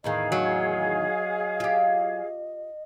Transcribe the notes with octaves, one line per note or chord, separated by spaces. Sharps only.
E2 A2 D#3 G#4 D#5 F5
F#3
F4 G4